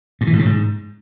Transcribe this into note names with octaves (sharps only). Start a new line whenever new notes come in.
G2
E3
G#2
C#3
G#2